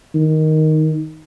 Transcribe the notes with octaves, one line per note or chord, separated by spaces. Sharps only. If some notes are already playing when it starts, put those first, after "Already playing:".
D#3